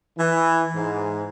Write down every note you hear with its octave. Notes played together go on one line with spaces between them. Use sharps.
E3
G#2